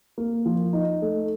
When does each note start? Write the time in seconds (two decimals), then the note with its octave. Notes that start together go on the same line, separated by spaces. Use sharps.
0.18 A#3
0.46 F3
0.73 D#4
1.02 A3